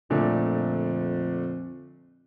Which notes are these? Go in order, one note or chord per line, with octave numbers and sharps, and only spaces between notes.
F2 A#2 D3 A3